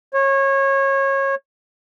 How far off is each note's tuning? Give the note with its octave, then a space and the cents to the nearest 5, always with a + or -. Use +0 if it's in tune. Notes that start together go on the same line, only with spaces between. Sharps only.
C#5 -25